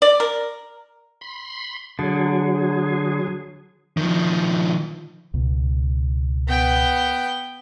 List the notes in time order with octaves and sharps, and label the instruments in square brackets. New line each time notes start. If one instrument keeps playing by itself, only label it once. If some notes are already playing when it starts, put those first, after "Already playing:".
[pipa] D5
A#4
[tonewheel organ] B5 C6
[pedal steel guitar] D3 [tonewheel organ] F#3 G#4
[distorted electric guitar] D#3 F3
[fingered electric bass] C#2 B2
[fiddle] B3 G5